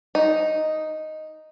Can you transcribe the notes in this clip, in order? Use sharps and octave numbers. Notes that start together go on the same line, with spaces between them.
D#4